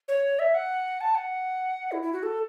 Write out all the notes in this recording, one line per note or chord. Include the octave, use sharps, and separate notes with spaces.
C#5
E5
F#5
A5
F#5
E4
E4
F#4
A4